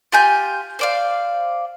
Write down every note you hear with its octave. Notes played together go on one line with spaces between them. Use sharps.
F4 G4 G#5 G6
C5 D5 F5